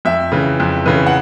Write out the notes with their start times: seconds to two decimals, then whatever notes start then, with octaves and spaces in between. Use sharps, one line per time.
0.05 F2 E5
0.32 C#3 E3
0.60 F2
0.86 C#3 E3
1.06 F#5